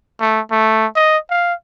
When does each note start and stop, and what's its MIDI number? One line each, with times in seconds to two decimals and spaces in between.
0.21 0.41 57
0.51 0.86 57
0.95 1.18 75
1.30 1.54 77